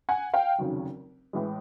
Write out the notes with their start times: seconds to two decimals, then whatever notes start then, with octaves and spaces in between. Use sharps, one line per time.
0.09 F#5 G#5
0.34 F5 G5
0.58 F1 D#2 C#3 F#3
1.33 A2 E3 G#3